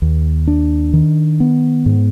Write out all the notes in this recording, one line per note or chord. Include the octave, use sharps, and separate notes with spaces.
D#2
D4
D#3
B3
G#2